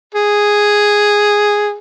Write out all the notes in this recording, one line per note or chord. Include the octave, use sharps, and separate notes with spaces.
G#4